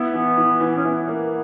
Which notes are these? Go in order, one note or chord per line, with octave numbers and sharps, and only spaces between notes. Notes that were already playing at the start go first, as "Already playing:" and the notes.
Already playing: B3 E4
E3
E3
E3
C#4
B3 E4
A#3